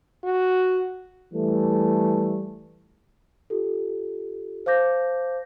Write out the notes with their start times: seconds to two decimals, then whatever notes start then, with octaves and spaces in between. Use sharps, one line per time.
0.24 F#4
1.33 E3 G3 A3
3.50 F4 G4 A4
4.66 C5 F5 A5 D6 G6 A#6